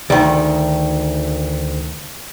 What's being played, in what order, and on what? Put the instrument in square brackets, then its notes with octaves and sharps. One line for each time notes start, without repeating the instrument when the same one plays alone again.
[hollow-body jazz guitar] D2 D#3